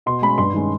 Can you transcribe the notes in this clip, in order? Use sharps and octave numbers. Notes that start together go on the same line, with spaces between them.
B2 C6
G#3 C#4 B5
G2 C6
D#3 G#3 C#4